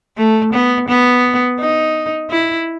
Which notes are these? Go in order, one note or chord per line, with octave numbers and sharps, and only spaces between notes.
A3
B3
B3
D#4
E4